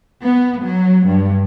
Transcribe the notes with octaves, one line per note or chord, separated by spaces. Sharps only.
B3
F#3
G2